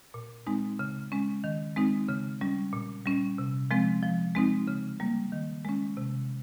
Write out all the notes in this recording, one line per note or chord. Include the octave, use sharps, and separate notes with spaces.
A#2
G#3 C4 D#4
C#3
G#3 C#4
D#3
G#3 C4 D#4
C#3
G3 C#4
A#2
G3 C#4
C3
F3 G#3 C4
F3
G#3 C4 D#4
C#3
G3 A#3
D#3
G#3 C#4
C3